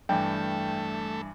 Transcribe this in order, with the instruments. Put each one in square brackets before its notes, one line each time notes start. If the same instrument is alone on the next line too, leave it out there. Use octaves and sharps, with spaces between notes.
[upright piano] G2 E3 [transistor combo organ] A3 [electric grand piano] G5